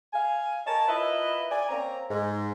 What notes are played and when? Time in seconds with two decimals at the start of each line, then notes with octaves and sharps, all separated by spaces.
0.13 F5 G#5
0.66 A#4 C#5 D#5 A5
0.88 E4 F4 A#4 B4 D#5 E5
1.50 D5 G#5
1.69 A#3 C4 C#4 A#5
2.10 G#2